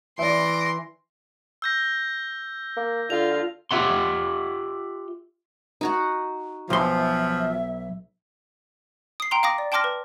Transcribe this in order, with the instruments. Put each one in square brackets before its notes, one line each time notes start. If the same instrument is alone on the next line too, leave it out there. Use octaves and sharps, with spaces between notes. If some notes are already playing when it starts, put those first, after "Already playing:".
[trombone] E3 [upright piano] D5 E5 [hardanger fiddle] C6 [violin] A#6 D7
[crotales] E6 G6 A#6
[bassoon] A#3
[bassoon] D3 [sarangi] F4 [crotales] F7
[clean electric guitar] F4 G4 A4 E5 F#5 C6
[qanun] D#4 F#4 F#5
[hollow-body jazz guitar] B1 C6 [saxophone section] F3 [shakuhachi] E5
[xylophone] D#6 C7
G5 A#5 C6
F5 G5 D6 D#6 A#6
D5
G5 A5 C6 D6 F6 A#6
B4